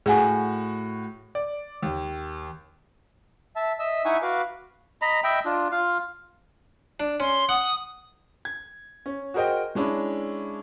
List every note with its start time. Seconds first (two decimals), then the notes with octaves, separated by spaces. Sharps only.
0.06 A2 F#4 G#4 F#5 G#5
1.35 D5
1.83 D#2
3.56 E5 A5
3.79 D#5 E5 E6
4.05 D#4 E4 E5 F#5 G#5 C#6
4.22 F#4 B4 F5 D6
5.02 D#5 A#5 B5
5.24 D#5 E5 G5 B5
5.45 D4 F4
5.72 F4 F5
7.00 D4
7.20 C#4 C6
7.49 F#5 D#6
8.45 G#6
9.06 C#4
9.34 F#4 G#4 A#4 C5 D#5 G5
9.75 G#3 C#4 D4 E4